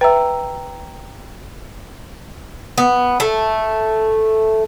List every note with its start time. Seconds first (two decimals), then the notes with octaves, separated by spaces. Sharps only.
0.01 B4 E5 G5 A#5 E6
2.78 B3
3.20 A3